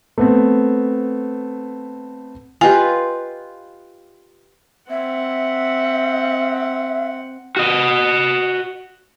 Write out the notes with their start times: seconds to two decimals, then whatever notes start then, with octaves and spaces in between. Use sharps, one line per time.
0.18 A3 B3 C4
2.61 F4 G4 B4 D#5 F5 G#5
4.90 C4 E5 F#5
7.57 F#4 D#5